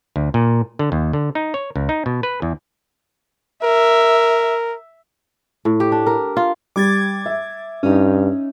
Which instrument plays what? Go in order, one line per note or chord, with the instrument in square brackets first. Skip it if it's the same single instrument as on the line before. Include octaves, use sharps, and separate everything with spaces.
[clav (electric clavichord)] D2
A#2
D3
D#2
D3
D#4
C#5
C#2
D#4
B2
B4
E2
[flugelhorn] A#4 [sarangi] E5
[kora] A2
G4
D4
A#4
F4
[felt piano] G3 [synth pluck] D6 G#6 A6
[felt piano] E5
[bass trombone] G2 [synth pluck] C#4 D#4